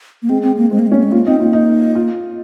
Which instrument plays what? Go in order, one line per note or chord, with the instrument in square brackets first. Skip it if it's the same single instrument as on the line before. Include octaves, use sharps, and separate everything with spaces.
[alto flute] A#3
[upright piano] G#3 [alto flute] C4
[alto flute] C4
A#3
[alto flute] G#3 [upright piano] C4
[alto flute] A#3
G#3
[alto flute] A#3 [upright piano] C#4
[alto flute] G#3
[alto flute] A#3 [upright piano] F4
[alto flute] C4 [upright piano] D#4
[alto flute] A#3 [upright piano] F4
[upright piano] D#4
F4